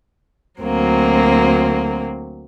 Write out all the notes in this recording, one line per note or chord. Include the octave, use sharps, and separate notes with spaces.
D2 F#3 A#3 C4